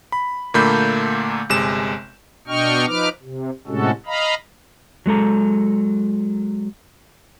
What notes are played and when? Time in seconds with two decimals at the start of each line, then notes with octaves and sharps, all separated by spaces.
0.12 B5
0.54 A#2 D3 A3 A#3 B5 G6
1.50 G1 C3 G#3 E7
2.47 B2 D4 D#5 G5 C#6 F6
2.86 F3 D#4 B4 D6 F6
3.23 C3
3.67 A2 C3 G#3 C#4 F#4 A4
4.06 D#5 F5 A#5 B5
5.06 F#3 G#3 A4 A#5